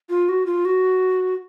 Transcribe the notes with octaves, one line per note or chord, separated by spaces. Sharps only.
F4
F#4
F4
F#4